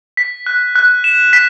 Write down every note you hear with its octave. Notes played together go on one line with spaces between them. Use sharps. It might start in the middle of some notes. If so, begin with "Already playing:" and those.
B6
F#6
F#6
E7
B6